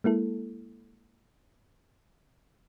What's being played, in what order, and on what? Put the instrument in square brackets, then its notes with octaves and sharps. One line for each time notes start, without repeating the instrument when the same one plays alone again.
[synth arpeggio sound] G#3 A#3 E4 A4